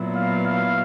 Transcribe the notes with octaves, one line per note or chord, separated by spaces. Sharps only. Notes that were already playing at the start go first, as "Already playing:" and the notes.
Already playing: A#2 F#3 B3 E4
F5
F5